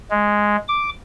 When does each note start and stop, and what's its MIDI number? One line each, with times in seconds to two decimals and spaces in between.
0.10 0.56 56
0.68 0.89 86